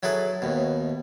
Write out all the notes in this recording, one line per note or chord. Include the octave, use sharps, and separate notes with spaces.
F#3 E4 G#4 A4 B4
D#2 B2